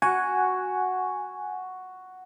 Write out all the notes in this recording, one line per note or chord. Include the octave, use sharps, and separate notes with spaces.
F#4 F#5 G#5